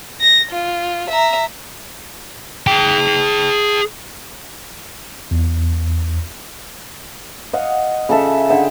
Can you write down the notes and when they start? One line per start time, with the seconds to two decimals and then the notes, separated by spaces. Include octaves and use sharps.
0.21 A#6
0.52 F4
1.10 E5 A#5
2.67 G#4 G5
5.31 E2
7.53 D#5 F5 F#5
8.09 C#3 A4 E5
8.50 D3 G#4 E5 G5